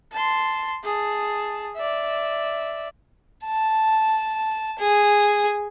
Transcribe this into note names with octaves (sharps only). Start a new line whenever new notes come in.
A5 C6
G#4 A5
D5 E5
A5
G#4